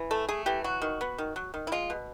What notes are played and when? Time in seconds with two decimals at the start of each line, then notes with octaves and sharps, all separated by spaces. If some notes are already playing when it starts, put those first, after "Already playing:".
Already playing: E3
0.11 A3 A4
0.29 A3 G#4
0.46 E3 G4
0.64 F#3 F#4
0.82 D#3
1.01 B3
1.18 D#3
1.36 F#3
1.54 D#3
1.67 E4
1.72 G#3 F4
1.90 B2